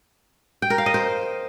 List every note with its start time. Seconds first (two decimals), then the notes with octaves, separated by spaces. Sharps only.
0.62 G5
0.70 A#4
0.78 F5
0.86 D#5
0.94 C5